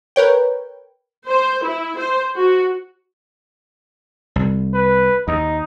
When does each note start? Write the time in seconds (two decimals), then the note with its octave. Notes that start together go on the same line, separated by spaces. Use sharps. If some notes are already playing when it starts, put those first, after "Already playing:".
0.16 A#4 B4 C#5 G5
1.27 C5
1.63 E4
1.98 C5
2.37 F#4
4.36 C2
4.74 B4
5.28 D#2 D#4